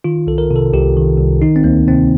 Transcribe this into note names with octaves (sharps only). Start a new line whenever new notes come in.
D#3 F4
C2 A4
A#4
C3
A4
C2 G4
D#3
C2
D#3 D#4
C4
D2 A#3
C3 C4